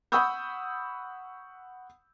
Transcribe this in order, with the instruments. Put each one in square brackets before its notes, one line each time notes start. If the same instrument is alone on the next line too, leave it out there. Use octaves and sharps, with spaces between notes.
[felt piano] F#5 B5 C#6 D#6 E6 G6